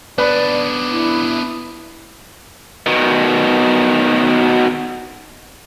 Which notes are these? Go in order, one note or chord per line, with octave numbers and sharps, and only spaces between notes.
B3 D4 B4 D5
E4
B2 D#3